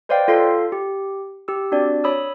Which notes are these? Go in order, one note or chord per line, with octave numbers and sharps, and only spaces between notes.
B4 C5 D5 D#5 F5 G5
F4 A4 F5 C6
G4
G4 E6
C4 D4 F#4 D5
C#5 B5 D#6 E6